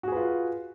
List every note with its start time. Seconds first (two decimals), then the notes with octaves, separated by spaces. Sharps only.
0.03 F#4
0.08 G#4
0.12 B4
0.16 F4